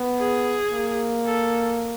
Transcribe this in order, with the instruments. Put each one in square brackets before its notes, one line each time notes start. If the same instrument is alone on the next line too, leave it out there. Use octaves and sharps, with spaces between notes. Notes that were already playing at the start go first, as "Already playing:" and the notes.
Already playing: [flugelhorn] B3
[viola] G#4
[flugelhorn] A#3
[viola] A4